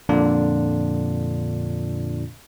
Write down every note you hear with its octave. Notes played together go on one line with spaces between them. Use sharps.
F2 A#2 D3 D4 F4